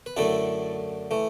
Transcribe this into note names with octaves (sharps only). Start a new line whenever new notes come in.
B4
F#2 D3 A3 E4 A4
E3 A3